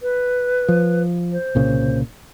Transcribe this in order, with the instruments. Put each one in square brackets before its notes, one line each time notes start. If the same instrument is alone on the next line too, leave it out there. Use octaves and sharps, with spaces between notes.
[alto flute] B4
[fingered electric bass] F3
[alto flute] C5
[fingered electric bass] C2 A#2 C#3